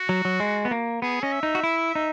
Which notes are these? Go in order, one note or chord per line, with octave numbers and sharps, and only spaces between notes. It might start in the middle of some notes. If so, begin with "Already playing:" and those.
Already playing: F#4
F#3
F#3
G#3
B3
A#3
B3 G#4
C#4 D#5
E5
D#4
F#4
E4
D#4